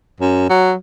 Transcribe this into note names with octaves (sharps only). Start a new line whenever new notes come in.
F#2
F#3